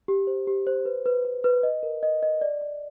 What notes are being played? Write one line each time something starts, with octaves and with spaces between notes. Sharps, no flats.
G4
C5
G4
C5
B4
B4
B4
B4
D#5
A#4
D#5
D#5
D5
D5